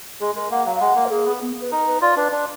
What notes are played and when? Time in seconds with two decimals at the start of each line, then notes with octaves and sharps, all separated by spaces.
0.20 G#3 G#4
0.35 G#3 A#4
0.51 A#3 F#5
0.66 F#3 F5
0.76 F5
0.80 G#3 F#5
0.95 A#3
1.05 A#4
1.11 A#3 G#4
1.26 B3
1.41 B3
1.61 B4
1.71 D#4 A#4
1.87 B4
2.01 F4 D5
2.16 D4 B4
2.32 D4